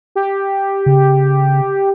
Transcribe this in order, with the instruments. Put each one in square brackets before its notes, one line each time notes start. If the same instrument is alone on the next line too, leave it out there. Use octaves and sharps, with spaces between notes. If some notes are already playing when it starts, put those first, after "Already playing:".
[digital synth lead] G4
[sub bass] C#3